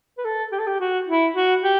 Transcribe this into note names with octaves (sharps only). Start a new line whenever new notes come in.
B4
A4
G4
A4
G4
F#4
E4
F#4
G4